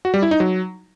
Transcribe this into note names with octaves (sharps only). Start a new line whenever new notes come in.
F#4
G3
E4
D#4
F#3